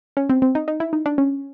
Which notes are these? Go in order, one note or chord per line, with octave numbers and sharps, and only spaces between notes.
C#4
C4
C4
D#4
D#4
E4
D#4
D4
C#4